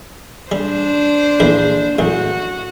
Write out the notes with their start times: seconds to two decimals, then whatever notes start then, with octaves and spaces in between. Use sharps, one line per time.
0.52 G3 D4 C5
1.40 A#1 E2 B5
1.99 A1 F#2 F#4